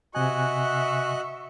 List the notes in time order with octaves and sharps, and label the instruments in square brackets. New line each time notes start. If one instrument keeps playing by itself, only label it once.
[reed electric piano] C3 G#5 [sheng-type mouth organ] F#4 D#5 F#6 [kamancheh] E5 C#6